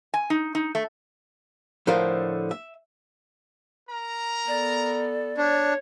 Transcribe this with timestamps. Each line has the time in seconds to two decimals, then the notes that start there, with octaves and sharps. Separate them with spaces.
0.14 G#5
0.30 D#4
0.55 D#4
0.75 A3
1.87 A2 D3 F3 A3 A#4 C5
2.51 E5
3.89 A#4 A#5
4.48 B3 A4 D5
5.37 D4 C#5